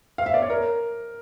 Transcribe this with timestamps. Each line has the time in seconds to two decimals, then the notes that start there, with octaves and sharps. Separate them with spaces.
0.18 F5
0.26 E5
0.34 D5
0.42 C#5
0.50 A#4